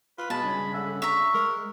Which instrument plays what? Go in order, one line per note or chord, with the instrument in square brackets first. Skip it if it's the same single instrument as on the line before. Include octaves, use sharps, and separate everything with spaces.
[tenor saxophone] F4 [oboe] B4
[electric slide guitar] B2 [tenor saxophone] G#3 [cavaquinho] A5 [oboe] B5
[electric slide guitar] G2 C#3 C#4
[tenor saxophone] D3 [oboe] E5
[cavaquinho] E5 A#5 [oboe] C#6
[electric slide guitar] G#3 [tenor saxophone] A#4